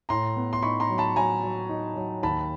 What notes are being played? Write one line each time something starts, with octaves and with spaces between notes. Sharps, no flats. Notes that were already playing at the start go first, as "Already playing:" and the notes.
A2 A#5 C6
B3
C6
D#4 B5 C#6
A#5 C6
F#3
A5 B5
F#3 G#5 A#5
F#3
D#4
F#3
D#2 A5 B5